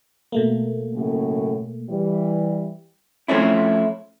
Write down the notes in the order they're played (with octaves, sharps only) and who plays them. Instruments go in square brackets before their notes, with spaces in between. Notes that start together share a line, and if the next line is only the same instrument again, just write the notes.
[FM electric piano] B2 A3 A#3
[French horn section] F#2 A2 C#3
E3 G3
[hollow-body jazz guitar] F3 A3 C4 C#4 E4